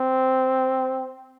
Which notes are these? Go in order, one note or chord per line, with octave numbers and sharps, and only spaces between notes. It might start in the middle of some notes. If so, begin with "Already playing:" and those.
Already playing: C4